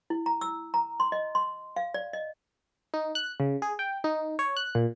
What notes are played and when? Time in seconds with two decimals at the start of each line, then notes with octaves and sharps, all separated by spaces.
0.10 E4
0.26 A#5
0.41 E6
0.74 A#5
1.00 C6
1.12 D#5
1.35 C6
1.76 F5
1.94 D5
2.13 D#5
2.94 D#4
3.15 F#6
3.40 C#3
3.62 G#4
3.79 G5
4.04 D#4
4.39 C#5
4.57 F#6
4.75 A#2